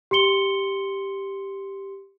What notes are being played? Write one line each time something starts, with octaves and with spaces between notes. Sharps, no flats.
G4 C6 C#7 G7